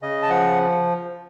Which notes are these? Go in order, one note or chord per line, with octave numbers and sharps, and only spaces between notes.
C#3 D#5
A5
F3 F#5